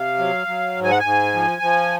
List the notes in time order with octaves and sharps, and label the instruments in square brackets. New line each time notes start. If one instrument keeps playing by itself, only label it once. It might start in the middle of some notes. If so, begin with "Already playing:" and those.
Already playing: [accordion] C3 F5
F#3
F#3
G#2
G#5
F#5
G#2 G#5
F3
F3